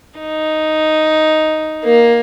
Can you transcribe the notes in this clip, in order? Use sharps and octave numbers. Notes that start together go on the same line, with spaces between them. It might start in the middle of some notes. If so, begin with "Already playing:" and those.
D#4
A#3